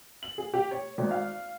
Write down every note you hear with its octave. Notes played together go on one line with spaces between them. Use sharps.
F#7
G#4
G4
C#5
G#1
F5